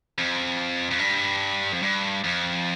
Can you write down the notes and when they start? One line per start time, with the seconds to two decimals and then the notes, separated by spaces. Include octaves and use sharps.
0.18 F2
0.91 F2
0.99 G2
1.73 F2
1.82 G2
2.24 F2